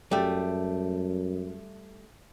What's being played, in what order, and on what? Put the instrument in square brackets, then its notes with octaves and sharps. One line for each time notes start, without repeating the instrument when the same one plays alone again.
[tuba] F#2 [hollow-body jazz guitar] G3 A3